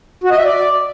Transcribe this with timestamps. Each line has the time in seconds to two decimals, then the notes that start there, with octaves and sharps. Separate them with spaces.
0.24 F#4
0.31 D#5
0.38 E5
0.44 D5